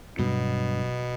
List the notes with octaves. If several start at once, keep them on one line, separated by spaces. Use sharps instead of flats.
G2 B2 F#3